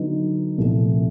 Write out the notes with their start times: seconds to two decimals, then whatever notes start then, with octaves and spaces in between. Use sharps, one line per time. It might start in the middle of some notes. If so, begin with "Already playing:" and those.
Already playing: D3 F#3 B3 D#4
0.58 C2 A#2 F3 A3 C4